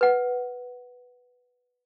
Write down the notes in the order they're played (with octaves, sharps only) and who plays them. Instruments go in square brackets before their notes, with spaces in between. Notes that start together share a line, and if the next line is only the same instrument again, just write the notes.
[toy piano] B4 F#5